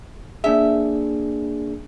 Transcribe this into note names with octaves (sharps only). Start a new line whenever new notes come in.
A#3 D4 G#4 E5